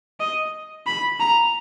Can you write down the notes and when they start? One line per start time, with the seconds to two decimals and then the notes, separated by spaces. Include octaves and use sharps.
0.20 D#5
0.87 B5
1.20 A#5